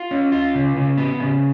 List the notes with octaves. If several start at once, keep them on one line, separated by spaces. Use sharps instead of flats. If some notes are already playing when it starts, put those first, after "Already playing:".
Already playing: F4
C#4
F4
C#3
C#3
B3
C#3